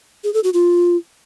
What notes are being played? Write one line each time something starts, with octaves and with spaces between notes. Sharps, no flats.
G#4
A4
F#4
F4